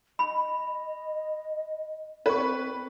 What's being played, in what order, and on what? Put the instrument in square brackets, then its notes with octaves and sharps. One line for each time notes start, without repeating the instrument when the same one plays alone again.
[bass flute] D#5 [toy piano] B5
[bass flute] C4 [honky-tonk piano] B4 C#6